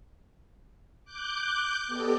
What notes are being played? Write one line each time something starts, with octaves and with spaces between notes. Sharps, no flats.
D6 F#6 G6
B3 G4 A4 D5 D#5